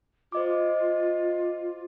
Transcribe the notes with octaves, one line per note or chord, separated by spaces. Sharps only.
F4 C5 D#5 D6